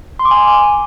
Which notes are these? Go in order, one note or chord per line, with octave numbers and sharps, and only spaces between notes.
C6
D6
G#5